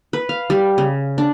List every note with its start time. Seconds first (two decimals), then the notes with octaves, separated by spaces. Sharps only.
0.13 B4
0.29 F5
0.50 G3
0.78 C#3
1.18 D4